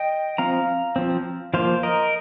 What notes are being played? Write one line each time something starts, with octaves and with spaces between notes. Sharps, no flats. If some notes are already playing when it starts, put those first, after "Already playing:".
Already playing: D#5 G5
F3 C4 F5 A#5
F3 C4
F3 A#3 C5 F5
A#4 D#5